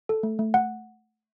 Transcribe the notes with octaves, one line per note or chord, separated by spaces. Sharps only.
A4
A3
A3
F#5